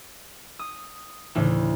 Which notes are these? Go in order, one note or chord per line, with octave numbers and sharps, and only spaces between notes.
D#6
D2 A2 C#3 E3